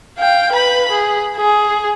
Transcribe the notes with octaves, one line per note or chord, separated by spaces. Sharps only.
F5 G5
B4 B5
G#4
G#4